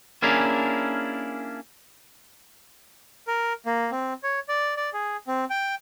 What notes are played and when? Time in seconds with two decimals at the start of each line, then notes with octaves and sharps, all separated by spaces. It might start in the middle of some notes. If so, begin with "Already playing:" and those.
0.22 A#3 C#4 D4 E4 G#4 A#4
3.28 A#4
3.66 A#3
3.92 C4
4.23 C#5
4.49 D5
4.77 D5
4.93 G#4
5.27 C4
5.50 G5